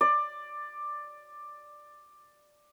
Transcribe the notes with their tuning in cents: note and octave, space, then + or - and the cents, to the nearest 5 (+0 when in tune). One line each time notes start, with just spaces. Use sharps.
D5 +10